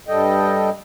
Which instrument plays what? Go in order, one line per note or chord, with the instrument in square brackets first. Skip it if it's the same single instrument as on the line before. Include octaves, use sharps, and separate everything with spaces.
[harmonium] G2 G3 A4 D#5 G5